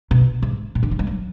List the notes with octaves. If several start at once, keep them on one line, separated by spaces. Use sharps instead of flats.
B2
G#2
A#2
D3
F#3
G#3
F#3